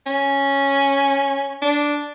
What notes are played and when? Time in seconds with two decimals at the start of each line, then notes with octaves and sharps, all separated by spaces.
0.06 C#4
1.62 D4